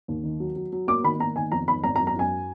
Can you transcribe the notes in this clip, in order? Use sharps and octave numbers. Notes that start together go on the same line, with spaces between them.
D#2
D#3
F#3
F#3
F#3
A#3 D6
D#3 B5
A#3 A#5
D#3 G#5
F2 A#5
D#3 B5
G#1 A#5
A#5
F#2
A#5
F#2 G#5